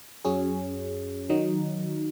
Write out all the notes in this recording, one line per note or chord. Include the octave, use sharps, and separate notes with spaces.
F#2 F#3 C#4 G#4
D#3 F#3 D#4